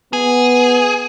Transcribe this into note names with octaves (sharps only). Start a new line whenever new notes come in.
B3 G#4